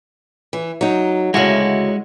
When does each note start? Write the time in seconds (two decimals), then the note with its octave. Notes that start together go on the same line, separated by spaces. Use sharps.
0.53 E3
0.81 F#3 D#4
1.34 D2 C#3 G#3 E4 F#4